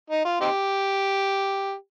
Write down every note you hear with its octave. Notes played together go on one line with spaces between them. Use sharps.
D#4
F4
C4 D#4 G4